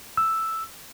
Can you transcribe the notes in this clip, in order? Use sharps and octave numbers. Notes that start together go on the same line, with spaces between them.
E6